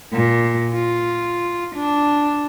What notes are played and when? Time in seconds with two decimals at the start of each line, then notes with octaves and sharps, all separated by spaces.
0.13 A#2
0.74 F4
1.75 D4